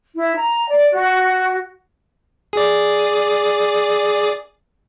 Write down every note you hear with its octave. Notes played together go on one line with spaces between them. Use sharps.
E4
A#5
D5
F#4
G#4 D5